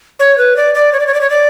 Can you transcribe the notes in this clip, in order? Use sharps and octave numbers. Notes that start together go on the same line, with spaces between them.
C#5
B4
D5
D5
C#5
D5
C#5
D5
C#5
D5